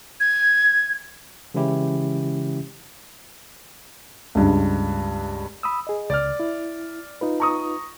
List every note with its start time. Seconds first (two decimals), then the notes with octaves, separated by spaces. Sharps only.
0.20 G#6
1.54 C#3 E3 G#3 C#4 E4 G4
4.35 C#2 G2
5.63 B5 D#6 E6
5.87 G#4 D#5
6.10 C#2 D5 F6
6.40 E4
7.21 D#4 F4 B4
7.40 A#5 C#6 D#6